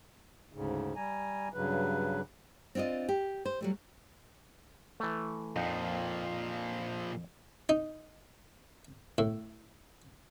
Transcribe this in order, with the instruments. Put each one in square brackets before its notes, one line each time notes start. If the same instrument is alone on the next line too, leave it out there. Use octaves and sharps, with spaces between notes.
[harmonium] D2 G#2 C#3
G3 G#5 A#5
G2 C#3 F#3 B4
[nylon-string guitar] C4 D4 F4 D5 D#5
G4
C5
F#3 G3 A3
[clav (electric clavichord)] E3 A3
[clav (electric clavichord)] F2 D#4 F#5 [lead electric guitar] A#2 F3
[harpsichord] D#4
A2